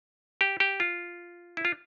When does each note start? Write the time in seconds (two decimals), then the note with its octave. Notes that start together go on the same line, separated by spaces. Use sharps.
0.41 G4
0.60 G4
0.80 F4
1.57 E4
1.65 F4